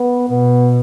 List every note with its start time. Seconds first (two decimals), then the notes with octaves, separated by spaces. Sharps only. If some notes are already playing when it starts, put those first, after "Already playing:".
Already playing: B3
0.29 B2 B3